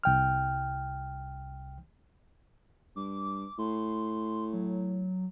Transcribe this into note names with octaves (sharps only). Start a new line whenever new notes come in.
C2 G5 F6
G2 D6
A2 C6
F#3